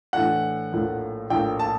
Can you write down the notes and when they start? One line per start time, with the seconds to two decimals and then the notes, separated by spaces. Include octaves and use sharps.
0.13 A2 E3 A3 D4 F#5
0.72 A#1 A2 F3 A#3
1.30 A#1 A2 F3 A#3 G5
1.59 A5